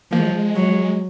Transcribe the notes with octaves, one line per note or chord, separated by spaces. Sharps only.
F3 A#3
G#3
F#3
G#3
F#3